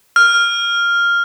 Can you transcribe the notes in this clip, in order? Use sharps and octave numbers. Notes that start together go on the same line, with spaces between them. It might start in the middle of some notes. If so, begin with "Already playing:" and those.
F6